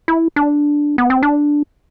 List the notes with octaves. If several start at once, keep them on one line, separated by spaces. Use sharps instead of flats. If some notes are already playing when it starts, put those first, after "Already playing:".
E4
D4
B3
C4
D4